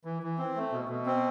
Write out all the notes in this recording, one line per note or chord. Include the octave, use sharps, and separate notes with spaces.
E3
E3
C4
A3
B2
B2
C4